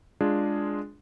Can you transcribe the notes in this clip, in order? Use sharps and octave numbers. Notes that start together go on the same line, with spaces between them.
G#3 D4 F4 G#4